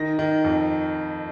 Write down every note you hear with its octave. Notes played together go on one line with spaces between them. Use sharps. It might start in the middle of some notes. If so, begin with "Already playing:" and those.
Already playing: D#3 A#6
D#3
F2